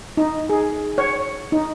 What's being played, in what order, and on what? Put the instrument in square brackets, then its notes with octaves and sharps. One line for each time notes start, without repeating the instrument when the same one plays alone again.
[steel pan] D#4
G#4
C#5
D#4